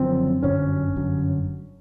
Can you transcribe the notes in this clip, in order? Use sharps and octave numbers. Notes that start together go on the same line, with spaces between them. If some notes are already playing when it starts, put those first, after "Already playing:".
Already playing: F#1 F#2 D3 F3 C4
G1 F#2 D3 F#3 C#4
G1 F#2 D3 F#3